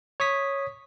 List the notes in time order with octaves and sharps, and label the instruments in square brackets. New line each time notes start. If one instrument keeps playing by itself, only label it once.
[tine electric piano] C#5 C#6 D#6 B6